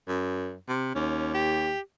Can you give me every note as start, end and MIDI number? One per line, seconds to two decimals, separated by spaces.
0.08 0.55 42
0.69 0.91 48
0.95 1.73 39
0.95 1.33 61
1.34 1.80 67